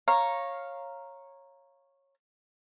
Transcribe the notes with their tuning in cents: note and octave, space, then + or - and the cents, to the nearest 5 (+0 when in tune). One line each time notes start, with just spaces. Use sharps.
C#5 -15 F5 +0 A#5 +0